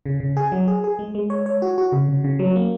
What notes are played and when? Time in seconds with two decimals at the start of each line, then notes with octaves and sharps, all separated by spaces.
0.06 C#3
0.20 C#3
0.37 G#4
0.52 F#3
0.68 G#4
0.84 G#4
0.99 G#3
1.15 G#3
1.30 C#5
1.46 C#5
1.62 F#4
1.78 F#4
1.92 C#3
2.09 C#3
2.24 C#3
2.39 F#3
2.56 A#3